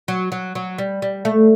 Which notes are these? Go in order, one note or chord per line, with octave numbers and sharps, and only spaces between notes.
F#3
F#3
F#3
G3
G3
A3